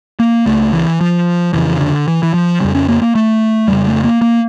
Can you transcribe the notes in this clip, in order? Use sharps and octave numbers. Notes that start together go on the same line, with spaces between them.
A#3
C#2 C#3 A3
E3
F3
F2 C#3 E3
D3
E3
E3
F3
F2 C#3 G3
C#4
A#3
A#3
A3
F2 C#3 G3
A3
A#3
A#3